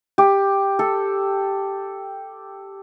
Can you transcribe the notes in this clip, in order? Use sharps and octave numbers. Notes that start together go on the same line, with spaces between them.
G4
A4